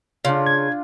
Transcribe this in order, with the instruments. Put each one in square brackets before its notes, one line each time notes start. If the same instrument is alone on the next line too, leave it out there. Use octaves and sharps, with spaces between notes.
[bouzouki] C#3 [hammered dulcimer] D4 F4
[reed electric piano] G#6